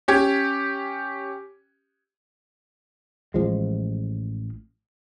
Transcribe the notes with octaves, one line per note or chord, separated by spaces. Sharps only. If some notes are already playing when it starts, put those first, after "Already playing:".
C#4 G4 G#6
A1 F3 G#3